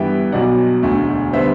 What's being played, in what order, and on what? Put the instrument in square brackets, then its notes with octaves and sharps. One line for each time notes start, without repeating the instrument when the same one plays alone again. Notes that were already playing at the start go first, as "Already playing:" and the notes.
Already playing: [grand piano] G2 E3 G3 B3 E5 G5
B1 B2 F#3 D5 F#5
E1 D2 D3 A3
D3 G3 B3 C5 E5